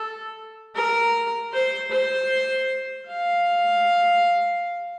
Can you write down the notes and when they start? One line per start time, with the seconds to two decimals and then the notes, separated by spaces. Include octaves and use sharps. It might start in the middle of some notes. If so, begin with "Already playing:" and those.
Already playing: A4
0.76 A#4
1.53 C5
1.91 C5
3.08 F5